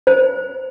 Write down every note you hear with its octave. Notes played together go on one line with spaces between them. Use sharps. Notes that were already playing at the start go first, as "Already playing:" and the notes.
C5